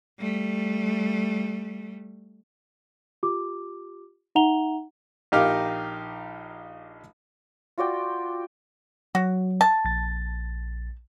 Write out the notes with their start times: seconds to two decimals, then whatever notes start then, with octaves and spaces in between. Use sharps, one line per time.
0.19 G3 A3
3.23 F4 G4 D6
4.35 D#4 E5 F#5 A#5 F7 G7
5.32 A#1 D#4 G4 A#4 F5 F6
7.78 F4 F#4 D5 G5
9.15 F#3 F#4
9.61 A5
9.85 A#1 A6